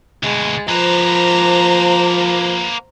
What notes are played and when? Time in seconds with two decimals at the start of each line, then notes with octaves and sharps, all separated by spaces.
0.23 D2 B2 G#3
0.69 F3 A#3 B4 C5 A#5